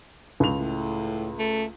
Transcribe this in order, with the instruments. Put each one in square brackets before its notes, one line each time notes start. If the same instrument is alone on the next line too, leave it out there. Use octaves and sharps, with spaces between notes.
[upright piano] C#2 F7
[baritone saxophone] A2
A3